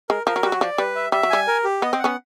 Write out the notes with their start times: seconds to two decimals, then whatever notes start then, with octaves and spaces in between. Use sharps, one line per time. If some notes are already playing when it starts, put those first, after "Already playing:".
0.09 G#3 A#4
0.26 F3 A#4
0.36 F#3
0.43 G3 F#4
0.52 F#3
0.61 F3 D5
0.78 G3 B4
0.95 E5
1.12 G3 E5
1.23 F#3
1.30 G3 G#5
1.47 A#4
1.64 G4
1.82 B3 D#5
1.93 C4
1.99 F#5
2.04 B3 C#4